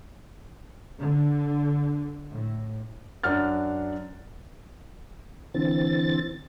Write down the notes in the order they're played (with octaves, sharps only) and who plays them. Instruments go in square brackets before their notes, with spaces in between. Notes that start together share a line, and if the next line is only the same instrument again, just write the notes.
[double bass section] D3
A2
[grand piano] F#2 D4 F#5 F6 A6
[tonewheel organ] D3 E3 C4 A6